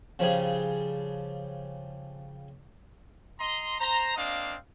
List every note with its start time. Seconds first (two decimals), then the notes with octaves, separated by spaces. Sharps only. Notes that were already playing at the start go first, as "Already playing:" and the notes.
0.19 C#3 F3 G3 G#4
3.39 D#5 A#5 C6
3.79 C5 A#5
4.15 A#3 C4 D4 D#5 F5